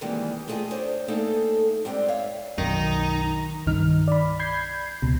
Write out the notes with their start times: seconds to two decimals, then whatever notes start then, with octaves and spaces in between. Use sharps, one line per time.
0.01 C3 D#3 E3 G3 G#3 A#3
0.48 A3 F4 G#4 D#5 G5
0.71 D4 C5 C#5
1.08 A3 A#3 D#4 G#4 A4 G5
1.85 G#2 G3 C4 D5 G5
2.08 C#5 E5 F5
2.58 B1 F#2 D#3 D#4 A#5
3.67 C2 G2 D#3 D#4 F6
4.08 D5 B5
4.39 B5 G6 G#6 C7
5.02 C#2 B2